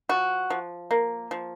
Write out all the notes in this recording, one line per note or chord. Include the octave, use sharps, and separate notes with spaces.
F3 F#4
F3
A#3
F3